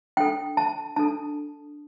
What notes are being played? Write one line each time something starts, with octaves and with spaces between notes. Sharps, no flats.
D4 A4 G5
A5
D4 A4 A5